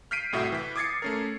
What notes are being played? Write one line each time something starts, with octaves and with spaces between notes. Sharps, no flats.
F6 G6 B6 C7 D7 D#7
C2 A2 F#4 E5
E3 B6
D6 D#6 G#6 A6 C7 C#7
A3 C#4 A#4